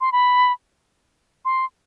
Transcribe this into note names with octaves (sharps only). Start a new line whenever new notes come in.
C6
B5
C6